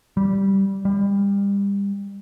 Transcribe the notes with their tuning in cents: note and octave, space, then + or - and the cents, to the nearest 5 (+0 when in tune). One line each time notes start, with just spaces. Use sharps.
G3 -10
G3 +30